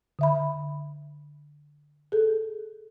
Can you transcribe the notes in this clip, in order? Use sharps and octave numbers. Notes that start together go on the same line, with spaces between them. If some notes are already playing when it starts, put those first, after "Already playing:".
D3 E5 B5
G#4 A4